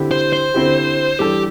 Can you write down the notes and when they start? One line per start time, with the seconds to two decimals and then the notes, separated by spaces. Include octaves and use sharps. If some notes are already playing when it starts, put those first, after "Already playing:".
Already playing: D3 C4 E4 G4
0.11 C5
0.33 C5
0.54 D3 C4 E4 G4
1.19 E3 G3 D4 G4 A4